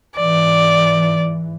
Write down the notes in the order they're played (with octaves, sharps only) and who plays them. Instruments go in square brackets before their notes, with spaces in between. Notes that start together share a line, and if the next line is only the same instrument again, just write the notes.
[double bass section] G#2 E3 [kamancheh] D5